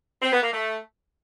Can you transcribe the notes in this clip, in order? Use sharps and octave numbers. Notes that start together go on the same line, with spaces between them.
C4
B3
A#3
A3